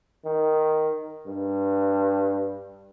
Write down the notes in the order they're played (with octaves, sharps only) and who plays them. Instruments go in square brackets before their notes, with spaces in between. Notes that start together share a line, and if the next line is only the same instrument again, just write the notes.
[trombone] D#3
G2